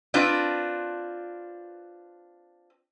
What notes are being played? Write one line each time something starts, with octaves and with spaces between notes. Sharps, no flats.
C4 D4 F4 B4